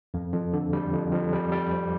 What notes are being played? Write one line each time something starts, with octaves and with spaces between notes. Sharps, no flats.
F2
F2
D3
G3
F2
F2
G3
G3
C4